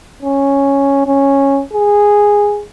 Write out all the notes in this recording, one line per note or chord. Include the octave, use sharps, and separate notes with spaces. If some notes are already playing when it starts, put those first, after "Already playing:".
C#4
C#4
G#4